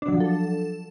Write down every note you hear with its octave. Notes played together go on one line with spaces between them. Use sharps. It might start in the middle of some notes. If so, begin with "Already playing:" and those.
D4
F#3
F3
A4